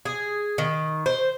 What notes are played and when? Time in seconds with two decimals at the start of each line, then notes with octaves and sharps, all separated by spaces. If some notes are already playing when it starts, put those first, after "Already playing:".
0.05 G#4
0.58 D#3
1.06 C5